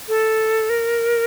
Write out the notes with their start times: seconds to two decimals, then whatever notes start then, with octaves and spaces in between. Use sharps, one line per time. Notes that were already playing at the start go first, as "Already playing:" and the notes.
0.09 A4
0.70 A#4